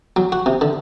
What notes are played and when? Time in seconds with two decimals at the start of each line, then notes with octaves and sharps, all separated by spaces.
0.16 F#3
0.32 F#4
0.46 C3
0.61 D3